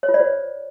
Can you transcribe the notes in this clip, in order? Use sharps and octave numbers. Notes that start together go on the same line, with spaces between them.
C#5
F4
D5
C5